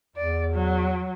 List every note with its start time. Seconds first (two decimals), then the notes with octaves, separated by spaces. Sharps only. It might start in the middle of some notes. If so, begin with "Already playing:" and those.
0.16 E2 D5
0.53 F#3